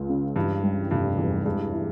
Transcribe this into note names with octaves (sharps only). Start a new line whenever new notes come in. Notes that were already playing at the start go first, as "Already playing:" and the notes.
Already playing: C#2
C#3
G2 E3
G3
F1 G2
E2
G2 G#3
E4